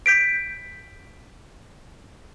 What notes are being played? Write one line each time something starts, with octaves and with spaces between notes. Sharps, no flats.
G6 B6 D7